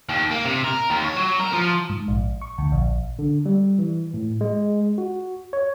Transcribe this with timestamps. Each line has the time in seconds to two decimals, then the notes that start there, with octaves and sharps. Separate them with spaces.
0.09 D#2
0.31 A#3
0.45 C3
0.64 A#4
0.90 D#2
1.05 C#5
1.17 F#3
1.40 A#4
1.53 F3
1.89 G#2
2.08 A#1
2.42 C#6
2.58 D2
2.72 A#1
3.19 D3
3.46 G3
3.79 E3
4.14 A2
4.41 G#3
4.98 F#4
5.53 C#5